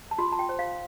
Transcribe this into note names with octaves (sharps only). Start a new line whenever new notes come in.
A5
F4 C6
A5
G5
C5
F5